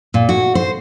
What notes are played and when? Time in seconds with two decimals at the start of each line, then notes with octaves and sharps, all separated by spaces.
0.14 A#2
0.29 F#4
0.55 C5